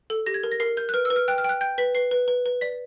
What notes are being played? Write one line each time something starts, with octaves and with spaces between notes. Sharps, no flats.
A4
G4 A#6
G#6
A#4
A#6
A#4 C7
A#4 G6
F#6
B4 F6
E6
B4
F6
G5 F#6
F6
G5 F#6
G5 G6
B4 B6
B4 C7
B4
B4
B4
D5 B6